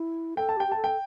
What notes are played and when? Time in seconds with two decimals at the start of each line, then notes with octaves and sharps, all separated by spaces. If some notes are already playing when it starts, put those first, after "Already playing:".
Already playing: E4
0.37 A4 G5
0.49 A5
0.57 G4
0.60 G5
0.68 G4
0.72 A4 A5
0.84 G5